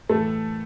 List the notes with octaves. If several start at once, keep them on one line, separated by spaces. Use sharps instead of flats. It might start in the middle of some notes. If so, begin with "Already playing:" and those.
A2 E3 A3 A4